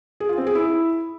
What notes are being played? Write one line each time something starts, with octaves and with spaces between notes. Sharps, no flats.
G#4
F4
C4
G#4
E4